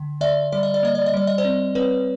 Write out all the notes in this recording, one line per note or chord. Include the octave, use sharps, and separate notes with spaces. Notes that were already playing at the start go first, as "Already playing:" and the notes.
Already playing: D3
D3 D5 E5
G3 D5
D#5
D5
A#3 D#5
D5
D#5
G3 D5
D#5
C5 D5
C4
C4 B4 C#5